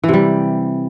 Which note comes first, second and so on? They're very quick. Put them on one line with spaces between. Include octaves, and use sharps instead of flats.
E3 C3 G3